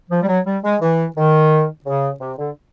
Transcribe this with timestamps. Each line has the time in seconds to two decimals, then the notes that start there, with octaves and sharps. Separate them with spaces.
0.10 F3
0.22 G3
0.28 F#3
0.45 G3
0.63 G#3
0.81 E3
1.15 D#3
1.85 C#3
2.20 C3
2.38 D3